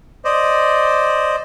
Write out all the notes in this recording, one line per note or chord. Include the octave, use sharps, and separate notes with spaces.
C5 D5 D#5